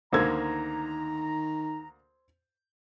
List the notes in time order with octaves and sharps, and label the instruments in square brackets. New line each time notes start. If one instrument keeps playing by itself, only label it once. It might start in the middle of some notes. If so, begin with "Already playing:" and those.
[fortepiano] D2 A#3 [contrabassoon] D#3 [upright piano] C5 E6 G#6 [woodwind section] A#5